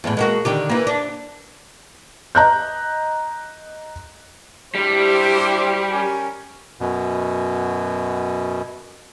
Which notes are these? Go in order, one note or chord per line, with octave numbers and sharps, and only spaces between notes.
E2 A2
G#3 A#3 F#4
D3 D#3 G4
E3 A#3
D4
D#5 A#5 F#6 G6
G3 D4 E4 G4 C5
C#4 A#4 G#5
F#2 B2